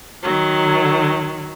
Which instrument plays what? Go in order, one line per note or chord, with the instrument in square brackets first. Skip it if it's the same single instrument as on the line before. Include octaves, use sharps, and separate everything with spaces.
[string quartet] D#3 F#3